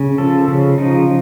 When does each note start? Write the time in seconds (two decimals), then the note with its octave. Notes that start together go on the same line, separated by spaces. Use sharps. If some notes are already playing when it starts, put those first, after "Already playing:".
Already playing: C#3
0.18 F3 A4
0.48 C#3
0.78 F3 D#4